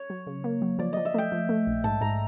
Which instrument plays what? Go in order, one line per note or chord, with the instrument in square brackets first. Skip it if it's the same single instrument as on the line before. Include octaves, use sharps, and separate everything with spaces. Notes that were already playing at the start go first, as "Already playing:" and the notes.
Already playing: [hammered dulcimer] C#5
[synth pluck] F#3
C#3
A#3
F#3
[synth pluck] F3 [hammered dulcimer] D5
[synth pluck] F3 [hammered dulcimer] D#5
[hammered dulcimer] E5
[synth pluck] A3 [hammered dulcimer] G5
[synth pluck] F3
A3
A#1
[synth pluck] G#2 [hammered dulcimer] A5
[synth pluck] G#2 [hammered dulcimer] A#5